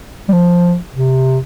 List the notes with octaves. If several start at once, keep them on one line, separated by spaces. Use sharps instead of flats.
G3
F3
C3